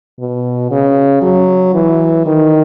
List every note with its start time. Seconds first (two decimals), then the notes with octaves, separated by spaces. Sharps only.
0.20 B2
0.71 C#3
1.22 F#3
1.74 E3
2.26 D#3